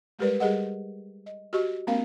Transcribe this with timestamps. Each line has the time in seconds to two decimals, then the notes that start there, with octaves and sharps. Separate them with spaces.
0.19 G3 G#3 G4 A#4 B4 D5
0.40 G3 G4 G#4 A#4 D#5 F#5
1.26 D#5
1.53 F#4 G4 D#5 C#6
1.87 A3 B3 C#4 A#4 F5